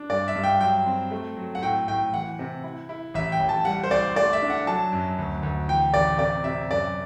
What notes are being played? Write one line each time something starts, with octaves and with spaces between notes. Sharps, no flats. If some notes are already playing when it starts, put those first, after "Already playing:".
Already playing: D4
G2 D5
E5
G2
G5
F#3 G5
C4
A3
F#3
F#5
A2 G5
A2 G5
E3 F#5
C3
E4
E4
A1 E5
G5
A1
A5
G3 F#5
C5
C2 D5
A3 D5
E5
D4
F#5
F#3 A5
F#2
D2
D2
E3 G5
A1 D5
C3 D5
C3 E5
F#2 D5